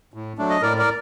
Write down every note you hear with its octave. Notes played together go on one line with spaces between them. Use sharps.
A2
F#3 A3 D4
D#5
A2 A#4 D5
A#4 D5